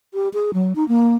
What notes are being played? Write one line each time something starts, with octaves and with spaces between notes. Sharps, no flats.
G4
G#4
F#3
D#4
A#3